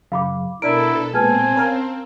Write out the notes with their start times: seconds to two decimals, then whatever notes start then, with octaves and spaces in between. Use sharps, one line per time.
0.12 F#2 C#3 F5 B5 D6
0.62 B2 D4 E4 A4 A#4 D7
1.14 A#2 G#3 B3 C4 G#5 A5 F6 G#6
1.56 C#4 A#4 F5